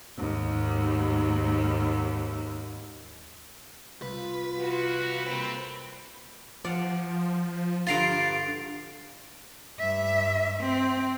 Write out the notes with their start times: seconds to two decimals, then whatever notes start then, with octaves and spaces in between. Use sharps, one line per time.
0.17 D#2 G#2
4.02 C2 F4 B4
4.57 E3 F3 F#4
5.26 G3 A3 A#3 C4
6.64 F3 D5 F5 F#5
7.87 G2 D3 F4 F5 A#5 A6 C7 D7
9.79 G2 E5
10.61 C4